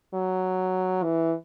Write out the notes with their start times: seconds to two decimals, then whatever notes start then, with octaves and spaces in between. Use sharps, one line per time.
0.14 F#3
1.03 E3